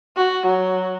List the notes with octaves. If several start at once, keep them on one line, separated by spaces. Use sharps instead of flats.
F#4
F#3